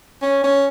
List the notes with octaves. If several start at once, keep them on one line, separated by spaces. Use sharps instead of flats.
C#4
C#4